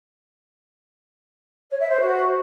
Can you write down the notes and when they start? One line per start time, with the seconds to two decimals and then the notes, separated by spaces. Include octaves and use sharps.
1.70 C#5
1.79 E5
1.89 C5
1.99 F#4